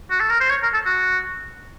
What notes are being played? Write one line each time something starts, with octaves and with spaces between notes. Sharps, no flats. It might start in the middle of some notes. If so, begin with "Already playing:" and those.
F#4
A4
A#4
C5
C#5
A#4
A4
F#4